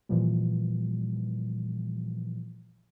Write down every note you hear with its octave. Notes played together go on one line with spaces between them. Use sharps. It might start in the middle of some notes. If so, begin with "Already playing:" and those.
A#2 E3 F3 G3